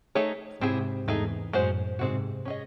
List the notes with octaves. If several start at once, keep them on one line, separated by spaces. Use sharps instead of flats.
A3 D#4 G#4 C#5
G#2 C3 C4 E4 G#4
E2 G#2 A3 D#4 G#4
F#2 A2 G#3 C#4 F#4 C5
G#2 C3 G#3 C4 F#4
C#4 G#4 D#5